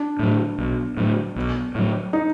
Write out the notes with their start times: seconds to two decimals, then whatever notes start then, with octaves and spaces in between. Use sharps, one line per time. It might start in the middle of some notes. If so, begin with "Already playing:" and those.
Already playing: D4
0.19 A2 F#3
0.58 B1
0.97 A2 F#3
1.36 B1
1.75 A2 F#3
2.13 D#4